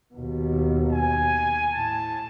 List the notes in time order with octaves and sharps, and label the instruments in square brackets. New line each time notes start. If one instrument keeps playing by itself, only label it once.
[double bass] D#2 B2
[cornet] G#5
[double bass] A2 [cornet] A5